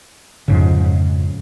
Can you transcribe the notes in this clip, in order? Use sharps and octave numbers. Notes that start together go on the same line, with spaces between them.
F2 G#2 C#3